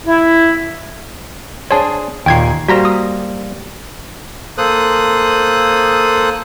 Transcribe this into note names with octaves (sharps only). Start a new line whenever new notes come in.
E4
D4 G#4 C5 C#5 A5
D#2 A#2 G5 G#6 C7
G3 A#3 F#4 C5 A#5 A#6
D#6
A#3 A4 C5 D#6 F#6